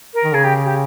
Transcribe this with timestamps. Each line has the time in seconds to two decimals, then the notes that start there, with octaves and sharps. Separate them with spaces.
0.14 A#4
0.24 D#3
0.34 C#3 G#4
0.44 G4
0.65 G4